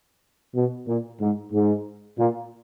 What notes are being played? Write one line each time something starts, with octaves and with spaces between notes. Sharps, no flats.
B2
A#2
G#2
G#2
A#2